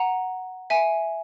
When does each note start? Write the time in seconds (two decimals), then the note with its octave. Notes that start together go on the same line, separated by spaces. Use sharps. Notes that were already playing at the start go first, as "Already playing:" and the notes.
Already playing: F#5 A#5
0.70 E5 G#5